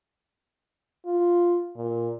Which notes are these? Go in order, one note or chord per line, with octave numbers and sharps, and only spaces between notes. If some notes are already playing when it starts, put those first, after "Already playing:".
F4
A#2